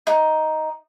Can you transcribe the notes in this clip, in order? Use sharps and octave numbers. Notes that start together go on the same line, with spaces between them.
D#4